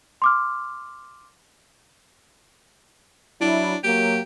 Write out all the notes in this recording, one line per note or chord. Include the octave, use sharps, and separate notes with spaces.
C6 D6 F6
F#3 D4 E4
F#3 A#3 G4